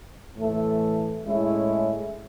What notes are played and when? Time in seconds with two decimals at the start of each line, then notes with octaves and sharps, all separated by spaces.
0.36 A2 E3 A3
1.23 A2 G#3 C#4 E4